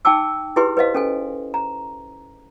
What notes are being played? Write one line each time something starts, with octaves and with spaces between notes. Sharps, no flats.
D#4 G5 A5 D6 E6
E4 G4 G#4 B4 C6
B4 C5 D#5 F5
C#4 A4 G#5
A#5